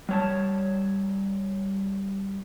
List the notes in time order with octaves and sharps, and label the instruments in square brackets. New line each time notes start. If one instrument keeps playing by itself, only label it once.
[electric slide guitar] G3 C#5 A5